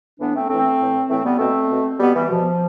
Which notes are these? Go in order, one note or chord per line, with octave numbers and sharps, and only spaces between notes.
A2 E3 B3 D4
A3 C4
A2 E3 A3 C4
A2 E3
A2 E3 A3 C4
G3 B3
B2 A3 C4
B2
B2 G3 B3
E3 G3
B2 F3